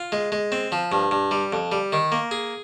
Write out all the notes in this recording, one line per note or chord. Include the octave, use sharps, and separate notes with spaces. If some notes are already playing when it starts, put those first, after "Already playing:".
Already playing: F4
G#3
G#3
C4
F3
G2
G2
G3
F2
G3
D#3
A#3
G#4